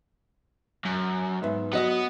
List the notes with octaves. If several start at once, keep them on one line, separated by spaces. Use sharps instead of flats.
F#2
G#2 B3 E5
F#3 B3 D#5 D#6